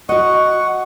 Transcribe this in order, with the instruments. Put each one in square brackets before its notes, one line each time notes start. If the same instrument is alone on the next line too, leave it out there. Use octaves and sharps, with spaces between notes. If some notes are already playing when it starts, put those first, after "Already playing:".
[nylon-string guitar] F#4 D#5 [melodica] F#5 C#6